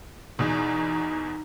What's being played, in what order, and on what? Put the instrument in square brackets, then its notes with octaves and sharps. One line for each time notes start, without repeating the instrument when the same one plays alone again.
[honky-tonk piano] E2 B2 [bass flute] D#4